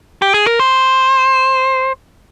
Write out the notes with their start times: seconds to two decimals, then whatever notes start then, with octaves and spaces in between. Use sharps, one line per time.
0.22 G4
0.34 G#4
0.47 A#4
0.59 C5